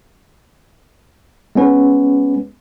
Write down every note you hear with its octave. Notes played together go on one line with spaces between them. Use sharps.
G#3 B3 C#4 B4